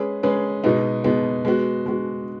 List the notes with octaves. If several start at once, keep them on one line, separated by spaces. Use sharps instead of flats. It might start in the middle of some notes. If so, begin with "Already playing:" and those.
Already playing: G#3 C#4 G#4 B4
G#3 C#4 G#4 B4
B2 G#3 B3 D#4
B2 G#3 B3 D#4
G#3 B3 F#4
G#3 B3 F#4